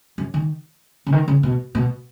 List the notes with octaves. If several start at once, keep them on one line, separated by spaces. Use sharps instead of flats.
F#2
D#3
C#3
D#3
C#3
B2
B2